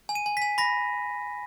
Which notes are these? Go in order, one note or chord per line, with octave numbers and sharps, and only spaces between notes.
G#5
D#7
G#5
G#5 B6
B5 A#6